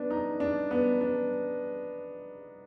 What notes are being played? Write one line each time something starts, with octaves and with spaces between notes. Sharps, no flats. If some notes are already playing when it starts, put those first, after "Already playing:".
Already playing: B3 D4
D#4
D4
B3
D4